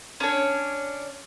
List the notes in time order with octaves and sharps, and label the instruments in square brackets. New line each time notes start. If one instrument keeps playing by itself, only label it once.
[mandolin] C#4 D4 C#5